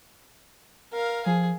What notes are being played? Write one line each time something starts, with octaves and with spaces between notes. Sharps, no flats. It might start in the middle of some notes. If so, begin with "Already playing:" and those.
A#4 F5
F3 G#4